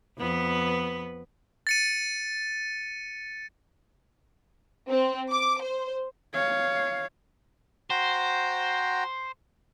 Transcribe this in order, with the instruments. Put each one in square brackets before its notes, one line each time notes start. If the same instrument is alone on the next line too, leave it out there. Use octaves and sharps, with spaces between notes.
[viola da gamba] F2 B3 B4
[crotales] A6 C#7 D#7
[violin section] C4
D6
C5
[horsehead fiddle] C#5 F5
[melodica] F#4 G5 A#5 [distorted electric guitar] C5